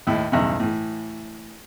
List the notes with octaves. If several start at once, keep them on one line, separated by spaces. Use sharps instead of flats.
D#2 A2 E4
B1 E2 G2 C#3
A2 E3